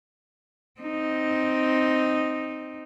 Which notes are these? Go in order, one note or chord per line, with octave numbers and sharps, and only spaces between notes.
C4 D#4